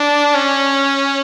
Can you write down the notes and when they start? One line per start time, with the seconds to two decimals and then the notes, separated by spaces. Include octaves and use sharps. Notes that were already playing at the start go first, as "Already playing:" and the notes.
Already playing: D4
0.34 C#4